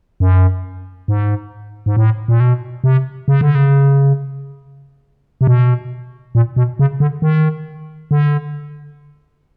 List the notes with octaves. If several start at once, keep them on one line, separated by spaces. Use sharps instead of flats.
F#2
G#2
G#2
A2
A#2
B2
C3
C#3
D3
C#3
C3
B2
A#2
B2
C#3
D3
D#3
D3